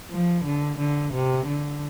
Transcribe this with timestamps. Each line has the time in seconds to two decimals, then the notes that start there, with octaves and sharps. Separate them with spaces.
0.10 F3
0.44 D3
0.79 D3
1.13 C3
1.46 D3